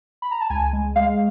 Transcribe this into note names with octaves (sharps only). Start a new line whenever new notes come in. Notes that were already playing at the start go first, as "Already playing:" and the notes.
B5
A#5
A5
C#2 G#5
G#3
G#3 F5